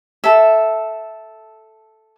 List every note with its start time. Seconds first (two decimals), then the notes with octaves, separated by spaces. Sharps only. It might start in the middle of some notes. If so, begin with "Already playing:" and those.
0.24 A4 E5